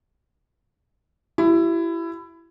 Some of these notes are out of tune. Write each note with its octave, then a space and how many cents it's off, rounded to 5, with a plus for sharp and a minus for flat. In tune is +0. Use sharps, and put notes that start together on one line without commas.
E4 +20 G4 -40